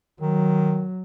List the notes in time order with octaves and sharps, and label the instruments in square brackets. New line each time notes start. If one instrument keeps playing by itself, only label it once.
[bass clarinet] D#3 [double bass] F#3